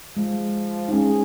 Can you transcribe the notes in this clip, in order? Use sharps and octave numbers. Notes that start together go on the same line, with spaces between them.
F3 G#3
D#4
G#3 C#4 G#4